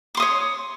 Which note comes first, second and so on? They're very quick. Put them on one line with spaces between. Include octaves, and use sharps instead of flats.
D6 C6 D#6 C#5